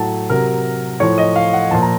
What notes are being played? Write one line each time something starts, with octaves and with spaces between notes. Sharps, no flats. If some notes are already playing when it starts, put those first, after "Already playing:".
Already playing: A2 F#3 A5
C3 F#3 A#4
A2 F3 C#5
D#5
F5
F#5
A#2 F3 A5
A#5